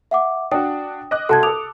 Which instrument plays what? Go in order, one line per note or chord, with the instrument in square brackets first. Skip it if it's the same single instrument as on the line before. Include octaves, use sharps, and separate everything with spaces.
[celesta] E5 F#5 D6
[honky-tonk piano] D4 F#4 [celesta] G5 D#6
[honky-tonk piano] D#5 D6 F#6
[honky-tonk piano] C2 F#4 C6 [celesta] A4 A5 G#6
[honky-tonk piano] A4 D6 [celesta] D#6 F7